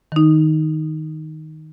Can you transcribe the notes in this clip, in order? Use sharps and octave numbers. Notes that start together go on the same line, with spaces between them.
D#3 D#4